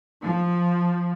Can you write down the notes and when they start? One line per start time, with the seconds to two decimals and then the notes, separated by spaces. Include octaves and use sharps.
0.23 F3